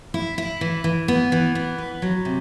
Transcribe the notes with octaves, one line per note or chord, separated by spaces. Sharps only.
E4
E4
E3
E3
B3
E3
B3
B4
F#3
C3